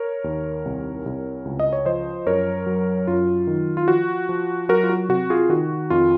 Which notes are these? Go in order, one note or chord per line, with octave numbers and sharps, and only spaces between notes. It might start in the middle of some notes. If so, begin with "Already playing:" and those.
Already playing: A#4 C#5
D#2
C2
C2
C#2
D#5
C#5
F3 C5 D#5
F#2 A#4 C#5
F#3
F#2 F4
D#3
F4
F3 F#4
F3
F#3 F#4 A#4
F4
F#4
C3 F#4
F4 G#4
D#3 F#4
F2 F4